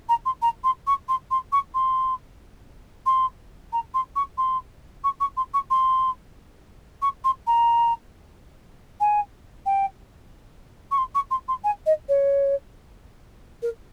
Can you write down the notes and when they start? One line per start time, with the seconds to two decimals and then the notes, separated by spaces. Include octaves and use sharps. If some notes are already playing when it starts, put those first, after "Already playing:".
0.08 A#5
0.25 C6
0.41 A#5
0.64 C6
0.87 C#6
1.08 C6
1.30 C6
1.52 C#6
1.74 C6
3.06 C6
3.72 A#5
3.94 C6
4.15 C#6
4.37 C6
5.04 C#6
5.20 C#6
5.36 C6
5.53 C#6
5.70 C6
7.02 C#6
7.24 C6
7.46 A#5
9.00 G#5
9.65 G5
10.91 C#6
10.97 C6
11.14 C#6
11.30 C6
11.48 C6
11.64 G#5
11.86 D#5
12.08 C#5
13.62 A#4